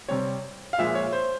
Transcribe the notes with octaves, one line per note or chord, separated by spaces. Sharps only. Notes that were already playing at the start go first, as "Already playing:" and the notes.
C3 G3 C4 C#5
F5
A#2 F3 G#3 E5
C#5
C5